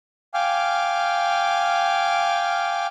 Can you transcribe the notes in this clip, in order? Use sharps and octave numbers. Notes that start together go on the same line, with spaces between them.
F5 G5 G#5 D6 F6